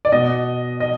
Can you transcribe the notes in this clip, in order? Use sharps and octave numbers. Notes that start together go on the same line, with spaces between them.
D5
B2 D#5
D#5